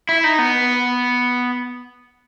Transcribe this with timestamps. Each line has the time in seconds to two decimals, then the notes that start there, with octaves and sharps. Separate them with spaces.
0.09 E4
0.24 D#4
0.39 B3